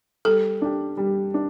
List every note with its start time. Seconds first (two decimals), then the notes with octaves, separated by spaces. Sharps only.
0.25 G3 A4
0.62 D4 G4
0.97 G3
1.34 D4